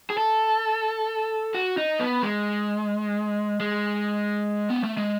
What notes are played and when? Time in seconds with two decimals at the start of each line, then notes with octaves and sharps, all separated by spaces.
0.10 G#4
0.17 A4
1.54 F#4
1.77 D#4
2.00 B3
2.23 G#3
3.60 G#3
4.70 B3
4.84 A3
4.97 G#3